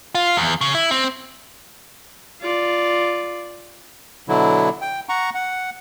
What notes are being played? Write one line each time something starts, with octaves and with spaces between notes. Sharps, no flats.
F4
E2
C#3
E4
C4
F4 D5
B2 D3 F#3 E4
G5
F#5 A#5 C#6
F#5